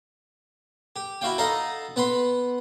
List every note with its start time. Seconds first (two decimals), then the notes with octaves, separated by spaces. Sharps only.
0.96 G4
1.21 E4 F#4 F5 G5
1.38 D#4 A4 D#5 F5 F#5 A#5
1.96 B3 F#5 B5 C6